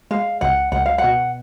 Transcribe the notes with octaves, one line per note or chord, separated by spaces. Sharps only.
G#3 F5
C#2 F#5
C#2 F#5
F5
F#5
B2